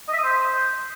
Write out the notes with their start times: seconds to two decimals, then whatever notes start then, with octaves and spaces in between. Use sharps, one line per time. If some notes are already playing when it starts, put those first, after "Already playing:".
0.08 D#5
0.13 E5
0.18 D#6
0.23 C5